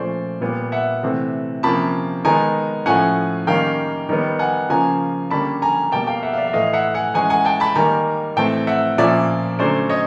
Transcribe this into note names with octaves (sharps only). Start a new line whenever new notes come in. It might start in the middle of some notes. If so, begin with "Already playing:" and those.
Already playing: A#2 F3 A3 C#4 C5 D5
A#2 G3 B3
E5 F#5
C3 E3 A3 C4
C3 F3 A#3 C#4 A5 B5
D#3 G#3 B3 G#5 A#5
A2 F3 A3 C#4 F#5 G#5
D#3 G3 A#3 C#4 F5 G5
D#3 G3 B3
F#5 G#5
C#3 F3 A#3 C#4 G#5 A#5
D3 G3 A#3 C#4 A5 B5
G#5 A#5
B2 G3 A#3 G5 A5
F5 G5
E5 F#5
F5
D5 E5
E5
A2 E3 A3 D#5 F5
E5 F#5
F#5 G#5
E3 G#3 C#4 F#5 G#5
F#5 G#5
G5 A5
A5 B5
D#3 G3 A#3 G#5 A#5
A2 E3 A3 C4 G5 A5
E5 F#5
A#2 F3 A#3 C#4 D5 E5
D3 F#3 A3 C#4 C5 D5
C#5 D#5